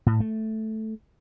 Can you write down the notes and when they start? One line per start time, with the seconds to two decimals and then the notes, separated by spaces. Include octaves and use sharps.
0.06 A2
0.20 A3